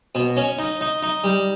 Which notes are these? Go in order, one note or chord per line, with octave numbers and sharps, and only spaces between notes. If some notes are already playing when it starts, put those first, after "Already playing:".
B2
C#4
D#4
D#4
D#4
G3